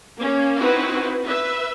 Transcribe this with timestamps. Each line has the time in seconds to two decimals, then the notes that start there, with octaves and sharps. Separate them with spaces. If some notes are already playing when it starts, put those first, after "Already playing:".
0.19 A#3 C#4
0.60 C4 D#4 E4 F#4 B4
1.24 B4 E5